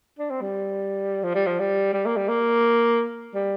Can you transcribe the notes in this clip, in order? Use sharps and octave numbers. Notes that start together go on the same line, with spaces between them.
D4
C4
G3
F3
G3
F3
G3
G3
A#3
G3
A#3
G3